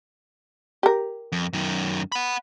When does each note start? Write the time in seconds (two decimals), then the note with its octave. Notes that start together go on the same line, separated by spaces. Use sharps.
0.83 G4 A#4
1.32 F2
1.53 F#2 D#3
2.12 F#5 B5